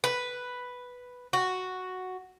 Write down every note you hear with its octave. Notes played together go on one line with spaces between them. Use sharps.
B4
F#4